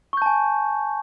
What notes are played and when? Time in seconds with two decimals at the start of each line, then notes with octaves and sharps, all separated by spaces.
0.13 C#6
0.17 G6
0.22 A5
0.26 G#5